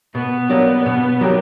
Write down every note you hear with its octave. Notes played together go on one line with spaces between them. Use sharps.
B2 B3
F#3 A#3 D4 G4
B2
F#3 A#3 D4 G4